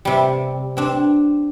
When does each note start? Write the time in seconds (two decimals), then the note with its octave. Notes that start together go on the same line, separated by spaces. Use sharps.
0.05 C3 G3
0.77 C4 D4